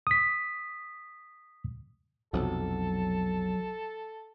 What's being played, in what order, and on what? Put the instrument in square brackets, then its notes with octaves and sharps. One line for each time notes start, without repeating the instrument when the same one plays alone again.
[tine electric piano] D#6 B6
[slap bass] B1 F2 C3 [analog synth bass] F#3 [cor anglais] A4